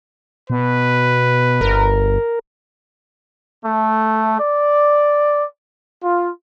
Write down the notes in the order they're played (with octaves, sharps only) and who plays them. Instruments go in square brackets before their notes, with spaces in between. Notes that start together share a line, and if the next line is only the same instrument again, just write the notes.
[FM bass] B2 [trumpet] B4
[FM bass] G1 [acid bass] A#4
[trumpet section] A3
D5
F4